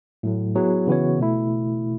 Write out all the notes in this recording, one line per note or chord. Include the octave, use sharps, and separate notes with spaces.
A2 F#3 A3
F#3 B3 E4 G#4
C#3 E3 B3 F#4 C#5
B2 A3 E4